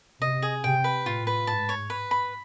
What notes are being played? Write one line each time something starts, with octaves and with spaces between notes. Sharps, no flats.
C3 D#5
G#4
C3 G5
B4
A2 F4
B4
G#2 A5
C#5
B4
B5